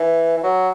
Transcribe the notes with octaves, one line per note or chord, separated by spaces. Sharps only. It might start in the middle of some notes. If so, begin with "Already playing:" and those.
Already playing: E3
E3
F#3